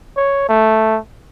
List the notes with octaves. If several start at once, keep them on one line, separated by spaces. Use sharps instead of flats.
C#5
A3